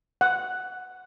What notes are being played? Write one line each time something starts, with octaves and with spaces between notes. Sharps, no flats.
F#5